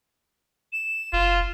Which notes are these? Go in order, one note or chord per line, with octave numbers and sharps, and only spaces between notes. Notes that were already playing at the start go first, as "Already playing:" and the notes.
E7
F#1 F4